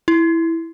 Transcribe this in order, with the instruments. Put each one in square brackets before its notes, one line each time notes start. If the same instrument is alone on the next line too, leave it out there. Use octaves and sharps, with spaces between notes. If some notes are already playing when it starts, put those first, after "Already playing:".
[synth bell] E4